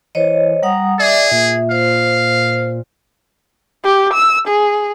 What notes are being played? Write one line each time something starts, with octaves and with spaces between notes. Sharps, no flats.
E3 C5 C#5 D#5
G3 F#5 A#5 D#6
G#4 D5 E5
A#2
C5 F5
G4
E6
G#4